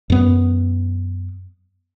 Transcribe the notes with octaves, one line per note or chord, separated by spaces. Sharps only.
F#2 B3